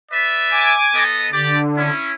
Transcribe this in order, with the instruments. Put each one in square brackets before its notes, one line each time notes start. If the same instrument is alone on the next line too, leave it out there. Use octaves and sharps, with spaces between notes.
[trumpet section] B4 D5 E5
[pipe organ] G#5 D6
[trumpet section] B3 A4 D#5
[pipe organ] D3 [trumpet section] G4 D5
[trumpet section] C#4 E4